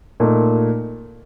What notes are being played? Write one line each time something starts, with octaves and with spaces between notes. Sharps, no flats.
A#2 A3 D#4